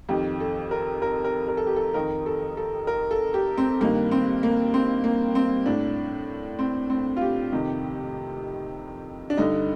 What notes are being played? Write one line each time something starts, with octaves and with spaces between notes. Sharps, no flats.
F2 D#3 G4
A4
A#4
A#4
A#4
A#4
A4
G4
A4
F2 D#3 A#4
A4
A4
A#4
A4
G4
C4
G2 D#3 A#3
C4
A#3
C4
A#3
C4
A2 D4
C4
C4
F4
G4
F2 C3 D#3
D4
G2 D3 D#4